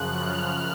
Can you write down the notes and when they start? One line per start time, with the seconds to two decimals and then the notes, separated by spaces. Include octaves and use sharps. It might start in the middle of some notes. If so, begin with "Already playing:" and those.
Already playing: F#2 C#3 F3 F#6
0.22 F6